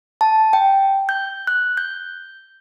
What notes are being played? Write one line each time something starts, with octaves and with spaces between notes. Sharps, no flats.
A5
G5
G6
F#6
G6